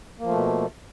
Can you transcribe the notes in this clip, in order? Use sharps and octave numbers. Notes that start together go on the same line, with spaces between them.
B2 F3 A3 A#3